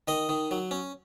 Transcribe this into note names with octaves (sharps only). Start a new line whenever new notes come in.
D#3 D#5
D#3
F#3
C#4